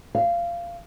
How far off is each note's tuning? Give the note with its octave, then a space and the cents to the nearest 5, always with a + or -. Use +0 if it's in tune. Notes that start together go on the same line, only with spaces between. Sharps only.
F5 -20